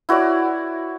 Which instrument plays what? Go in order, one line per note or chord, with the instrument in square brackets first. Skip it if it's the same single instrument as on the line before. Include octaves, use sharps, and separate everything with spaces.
[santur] E4 F#4 C#5 D5